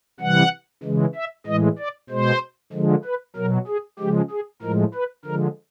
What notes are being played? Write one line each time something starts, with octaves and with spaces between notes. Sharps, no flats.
C3 E3 G3 F#5
C#3 E3 G#3
E5
A2 E3 G#3 D#5
D5
B2 G#3 C5
D3 F3 G#3
B4
B2 F#3 A#4
G#4
C#3 F3 G#3 G4
G#4
A2 F3 G#3 A#4
B4
D3 F3 G#3 A#4